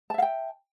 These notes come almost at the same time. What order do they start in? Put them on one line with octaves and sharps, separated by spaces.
A5 E5 F5 G5